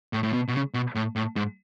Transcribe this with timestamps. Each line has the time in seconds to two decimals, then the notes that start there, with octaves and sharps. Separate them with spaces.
0.13 A2
0.23 A2
0.33 B2
0.48 B2
0.54 C#3
0.74 B2
0.95 A2
1.16 A2
1.36 G#2